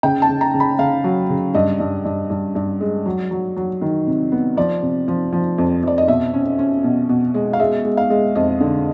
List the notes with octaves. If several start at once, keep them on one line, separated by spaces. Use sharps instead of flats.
C#3 G5
A5
C#3
A#5
C#3
B5
C#3 F5
F#3
C#3
G2 D#5
G2
G2
G2
G2
G#3
F#3
F#3
F#3
D#3
C3
B3
F3 D5
C3
F3
F3
F2
F2 D5
D#5
B2 E5
C#4
C#4
B2
B2
G#3
F5
G#3 E5
G#3
F5
G#3
F2 D#5
D3